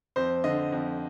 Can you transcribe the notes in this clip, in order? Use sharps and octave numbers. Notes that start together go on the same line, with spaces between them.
F2 C5
D3 D#5
F2